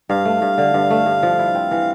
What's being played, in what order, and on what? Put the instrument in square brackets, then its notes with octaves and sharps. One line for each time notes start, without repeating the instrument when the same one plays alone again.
[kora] G2 [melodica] F5
[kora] A3
G2
D3
G2
A3
G2
F3
E4
C4
E3